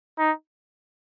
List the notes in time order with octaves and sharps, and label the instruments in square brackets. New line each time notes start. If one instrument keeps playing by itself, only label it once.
[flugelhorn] D#4